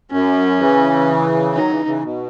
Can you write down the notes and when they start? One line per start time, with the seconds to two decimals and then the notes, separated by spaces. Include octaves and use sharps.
0.11 F#2 C#4
0.59 C#3 E3
1.54 D#3 F#3 D#4
1.70 C#3 E3
1.86 C#3 E3
2.03 B2